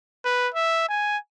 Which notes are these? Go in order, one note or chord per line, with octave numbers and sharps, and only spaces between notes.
B4
E5
G#5